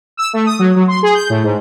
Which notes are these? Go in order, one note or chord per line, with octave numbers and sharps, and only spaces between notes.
E6
A3
D#6
F#3
F#3
C6
G#4
G6
A2
G#2